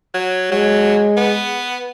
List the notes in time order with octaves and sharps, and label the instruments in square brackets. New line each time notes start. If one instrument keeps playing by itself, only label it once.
[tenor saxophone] F#3
[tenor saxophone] F#3 [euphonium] G#3
[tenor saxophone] B3